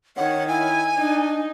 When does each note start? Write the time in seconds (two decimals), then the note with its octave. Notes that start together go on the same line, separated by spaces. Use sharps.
0.17 D#3 C#5 F#5
0.48 E4 G#5
0.97 D4 D#4